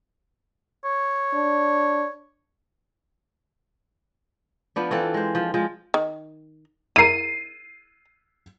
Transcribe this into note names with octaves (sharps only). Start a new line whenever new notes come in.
C#5
D4
F3 B3 D4
E3 C4 F4 A4
G#3 C5
F3
F3 G#3
D#3
E4 A#4 C7 D#7